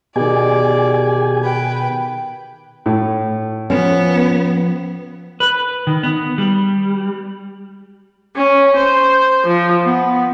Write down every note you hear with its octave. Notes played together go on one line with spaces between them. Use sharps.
B2 D#3 G4 G#4 D5 G#5
B4 G5
A2
F3 B3 C#4
B4
D#3
B3
G3
C#4
C5
F3
B3